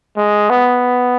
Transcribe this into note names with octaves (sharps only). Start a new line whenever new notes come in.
G#3
B3